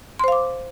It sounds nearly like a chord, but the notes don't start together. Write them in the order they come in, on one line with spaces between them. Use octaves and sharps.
C6 C5 F5 D6